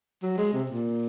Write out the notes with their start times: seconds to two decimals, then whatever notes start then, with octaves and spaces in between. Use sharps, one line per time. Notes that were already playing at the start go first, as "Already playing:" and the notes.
0.23 F#3
0.38 G#3
0.53 C3
0.70 A#2